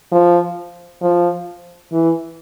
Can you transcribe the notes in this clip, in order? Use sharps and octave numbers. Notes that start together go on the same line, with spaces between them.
F3
F3
E3